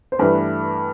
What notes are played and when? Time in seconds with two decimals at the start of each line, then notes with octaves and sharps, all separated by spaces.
0.12 C5
0.19 G2 E3 A3 D4 B4